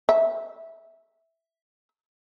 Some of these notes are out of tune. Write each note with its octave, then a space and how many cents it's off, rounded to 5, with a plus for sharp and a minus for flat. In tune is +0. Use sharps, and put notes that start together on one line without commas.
E5 -5